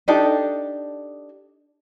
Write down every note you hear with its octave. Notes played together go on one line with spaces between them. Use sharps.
D4 D#4 G4 A4